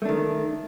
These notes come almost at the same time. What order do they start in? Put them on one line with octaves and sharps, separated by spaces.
A3 D4 D#3